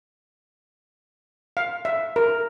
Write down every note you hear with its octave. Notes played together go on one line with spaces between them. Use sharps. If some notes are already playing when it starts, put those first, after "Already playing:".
F5
E5
A#4